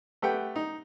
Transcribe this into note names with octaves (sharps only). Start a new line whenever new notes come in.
A3 G4 B4 F#5 G5
D#4